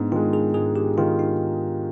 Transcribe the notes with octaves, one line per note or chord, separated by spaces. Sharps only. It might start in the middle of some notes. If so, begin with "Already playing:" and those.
Already playing: G#2 B3 D4
D#3 G#3 F4
G#4
G#2 G#4
G4
D#3 G#3 F4
D#4